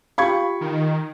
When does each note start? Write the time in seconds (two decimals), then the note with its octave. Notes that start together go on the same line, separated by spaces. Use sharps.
0.18 F4 G4 F5 B5 C#6 G#6
0.61 D#3